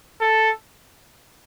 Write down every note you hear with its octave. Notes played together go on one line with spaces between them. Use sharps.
A4